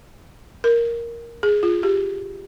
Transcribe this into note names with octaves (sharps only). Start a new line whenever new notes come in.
A#4
G#4
F4
G4